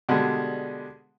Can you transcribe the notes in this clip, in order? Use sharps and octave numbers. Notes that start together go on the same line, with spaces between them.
B2 D3 G3 G#3